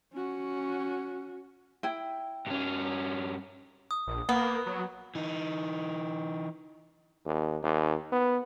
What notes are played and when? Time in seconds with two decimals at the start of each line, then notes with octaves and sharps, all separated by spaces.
0.13 C#4 F#4
1.83 E4 G5
2.47 G2 C#4
3.91 D#6
4.07 A#1
4.29 A#3 B3
4.66 F#3
5.15 E3 D#4
7.26 D#2
7.63 D#2
8.12 B3